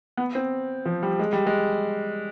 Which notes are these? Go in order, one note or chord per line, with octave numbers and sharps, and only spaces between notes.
B3
C4
F3
G3
G#3
G3
G#3